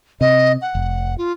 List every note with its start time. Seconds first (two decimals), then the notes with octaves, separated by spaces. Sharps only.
0.21 C3 D#5
0.62 F#5
0.75 F1
1.18 F4